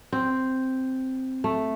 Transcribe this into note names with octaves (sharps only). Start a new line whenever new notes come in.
C4
A3